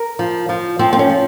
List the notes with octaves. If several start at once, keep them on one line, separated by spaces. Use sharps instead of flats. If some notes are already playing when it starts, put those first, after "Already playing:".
Already playing: A#4
F3
F3
F3 C4
C4
C#4
F3